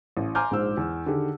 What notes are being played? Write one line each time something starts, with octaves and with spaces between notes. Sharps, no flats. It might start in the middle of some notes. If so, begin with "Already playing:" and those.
A1
G#5 A#5 C6 D6 F6 G6
A#1 G#2 C5 E6
E2
D3 D#3 G4 G#4